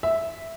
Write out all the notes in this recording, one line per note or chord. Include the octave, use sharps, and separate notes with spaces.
E5